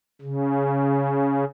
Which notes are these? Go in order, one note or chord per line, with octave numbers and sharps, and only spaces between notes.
C#3